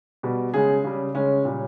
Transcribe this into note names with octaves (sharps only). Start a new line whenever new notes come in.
B2 G3
C#3 G#3 G#4
C#3 G3
C#3 G#3 C#4
A#2 G3